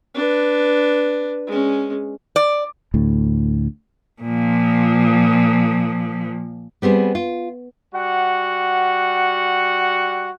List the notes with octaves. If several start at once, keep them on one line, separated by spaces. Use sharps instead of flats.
D4 B4
G#3 C#4
D5
D2 A2
A#2 F3
G3 B3 C4 G#4
F4
G3 F#4 F#5